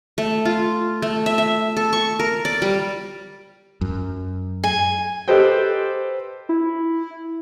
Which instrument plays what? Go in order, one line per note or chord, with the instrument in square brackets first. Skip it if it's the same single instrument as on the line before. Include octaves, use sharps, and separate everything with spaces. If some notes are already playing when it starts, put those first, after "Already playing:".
[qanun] A3
F4
A3
E5
E5
A4
C#6
A#4
D5
G3
[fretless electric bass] F#2
[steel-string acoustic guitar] G#5
[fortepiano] G4 A4 B4 C5 D#5 G5
[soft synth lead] E4